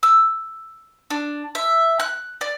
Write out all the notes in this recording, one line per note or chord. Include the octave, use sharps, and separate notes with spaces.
E6
D4
E5
F#6
D5